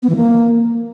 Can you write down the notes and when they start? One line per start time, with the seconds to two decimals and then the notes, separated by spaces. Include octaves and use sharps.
0.03 B3
0.09 E3
0.16 A#3